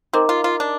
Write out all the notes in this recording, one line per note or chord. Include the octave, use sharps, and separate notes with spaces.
C4 D#4 A#4 D#5 A#5 D6
F4
F4
D4